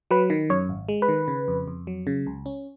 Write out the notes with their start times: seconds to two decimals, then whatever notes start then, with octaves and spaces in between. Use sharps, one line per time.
0.11 F#3 B4
0.30 D#3
0.50 F#2 C#5
0.69 G#1
0.89 G#3
1.02 B4
1.08 D#3
1.28 C#3
1.48 F2
1.67 F2
1.87 F#3
2.07 C#3
2.27 C#2
2.46 C#4